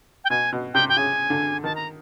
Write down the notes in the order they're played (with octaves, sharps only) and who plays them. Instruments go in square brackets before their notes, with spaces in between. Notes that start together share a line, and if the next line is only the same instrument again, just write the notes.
[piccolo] G5
[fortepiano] B2 [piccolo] G#5
[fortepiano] B2
[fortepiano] C3 [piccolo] G5
[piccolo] G5
[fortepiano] C#3 [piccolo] G#5
[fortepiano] D3
[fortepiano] D#3 [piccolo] A5
[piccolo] A#5